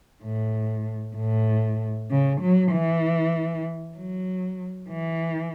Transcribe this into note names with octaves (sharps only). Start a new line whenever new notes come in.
A2
A2
C#3
F#3
E3
F#3
E3